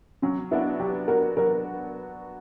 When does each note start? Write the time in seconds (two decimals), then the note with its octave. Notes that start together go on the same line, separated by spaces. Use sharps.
0.22 F#3 C#4
0.51 B3 D4 E4 F#4
0.79 F#3 G4
1.08 B3 D4 F#4 A#4
1.37 F#3 A#4